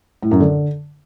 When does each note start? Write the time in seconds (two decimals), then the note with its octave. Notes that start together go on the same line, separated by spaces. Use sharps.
0.22 A2
0.31 F#2
0.40 D3